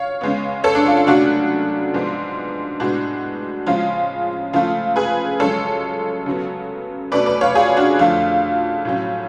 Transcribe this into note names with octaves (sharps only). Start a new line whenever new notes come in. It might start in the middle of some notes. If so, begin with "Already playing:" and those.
Already playing: C#5 F5
C#3 G#3 B3
A4 C#5
D4
F4
F4
F#2 C#3 F#3 A3 D4 F#4
G#2 F3 G#3 B3
A2 G#3 B3 D4 F#4
C#3 F3 G#3 C#4 F4
C#3 F3 A3 F4
G#4 B4
F#2 C#3 F3 G#3 A4 C#5
C#3 F#3 B3
B2 A3 C#4 B4 D5
B4 D5
C#5 F5
F4 G#4
D4 F#4
F2 D3 F3 A3 F4
A2 F#3 C#4